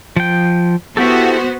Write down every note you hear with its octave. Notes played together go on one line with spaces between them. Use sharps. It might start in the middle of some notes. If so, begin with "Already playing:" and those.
F3 G5
B3 E4 F#4 G4 A4 C5